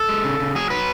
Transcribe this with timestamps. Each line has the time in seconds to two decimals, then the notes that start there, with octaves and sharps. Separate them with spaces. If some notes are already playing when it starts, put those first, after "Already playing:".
Already playing: A4
0.09 G#3
0.24 C#3
0.40 C#3
0.55 F#3 G#4
0.70 F#3 B4